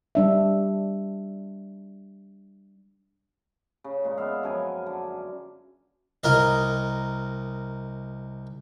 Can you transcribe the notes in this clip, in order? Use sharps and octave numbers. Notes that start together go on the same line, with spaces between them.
G3 D4 E5
C#3
A#2 G#3
B3 E5 F5
F#2 F3 A#4 G#5
D3
C2 A#4 D#5